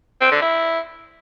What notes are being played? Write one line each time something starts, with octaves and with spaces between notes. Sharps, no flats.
C4
D3
E4